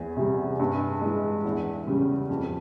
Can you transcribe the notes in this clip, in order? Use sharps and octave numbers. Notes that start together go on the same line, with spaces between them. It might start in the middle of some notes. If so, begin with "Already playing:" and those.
Already playing: E2 G#4
C3 G3
G2
E3 G#3
E2
C#3 G3
F2